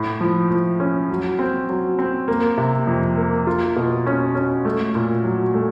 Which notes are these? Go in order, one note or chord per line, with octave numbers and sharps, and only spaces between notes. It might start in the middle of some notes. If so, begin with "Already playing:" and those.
Already playing: A2
F3
F3
C#4
F#3
C4
F#3
C4
A#3
C3
F2
A#3
F4
B2
C#4
C#4
A3
A#2
F#3
A3